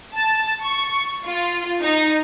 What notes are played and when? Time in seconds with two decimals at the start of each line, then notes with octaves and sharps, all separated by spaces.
0.15 A5
0.63 C#6
1.26 F4
1.82 D#4